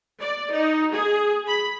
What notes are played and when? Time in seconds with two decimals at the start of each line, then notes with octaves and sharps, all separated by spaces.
0.20 D5
0.51 D#4
0.92 G#4
1.47 B5